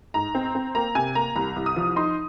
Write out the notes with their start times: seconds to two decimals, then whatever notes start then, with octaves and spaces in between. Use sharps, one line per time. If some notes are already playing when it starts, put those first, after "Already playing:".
0.14 G#2 A#5
0.35 C4
0.55 C4
0.75 A#3 A#5
0.95 C3 G#5
1.15 A#3 A#5
1.36 C2 A#5
1.56 C2
1.66 D#6
1.76 F3
1.96 D#4 C6